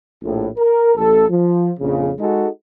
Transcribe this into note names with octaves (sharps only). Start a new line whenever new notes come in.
A#1 A2
A#4
A1 A4
F3
A#1 F2 C#3
G#3 D#4 F#4 G#4 A4